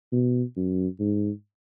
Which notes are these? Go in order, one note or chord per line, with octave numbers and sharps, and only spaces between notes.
B2
F#2
G#2